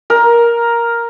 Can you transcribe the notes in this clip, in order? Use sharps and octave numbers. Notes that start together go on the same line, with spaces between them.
A#4